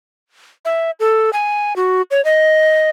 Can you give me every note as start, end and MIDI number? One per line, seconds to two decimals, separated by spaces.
0.65 0.91 76
1.00 1.30 69
1.33 1.76 80
1.76 2.02 66
2.11 2.24 73
2.25 2.90 75